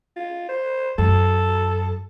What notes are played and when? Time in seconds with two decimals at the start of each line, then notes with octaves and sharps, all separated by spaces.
0.16 F4
0.49 C5
0.98 F#2 A4